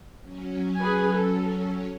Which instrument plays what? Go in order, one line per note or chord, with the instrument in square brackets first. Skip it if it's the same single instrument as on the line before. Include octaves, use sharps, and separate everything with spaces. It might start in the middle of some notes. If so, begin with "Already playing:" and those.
[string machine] F#3 C#4
[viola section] G#4 B4 G#5
A4